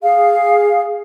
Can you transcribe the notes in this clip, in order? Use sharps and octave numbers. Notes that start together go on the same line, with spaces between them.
G#4 F5